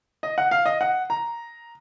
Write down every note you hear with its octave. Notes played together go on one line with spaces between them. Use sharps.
D#5
F#5
F5
D#5
F#5
A#5